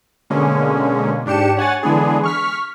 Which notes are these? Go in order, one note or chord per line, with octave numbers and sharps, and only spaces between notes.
B2 D3 G#3 A#3 C#4
G#2 D4 G4 C#7 E7
C#5 F#5 G#5 A6
D3 E3 G#3 B3 D4 G#4
C#6 F6 B6